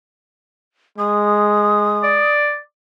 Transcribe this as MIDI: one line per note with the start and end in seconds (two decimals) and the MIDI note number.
0.98 2.27 56
0.98 2.32 87
2.03 2.58 74